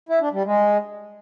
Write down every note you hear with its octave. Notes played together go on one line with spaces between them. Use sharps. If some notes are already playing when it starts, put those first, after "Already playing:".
E4
D4
G3
G#3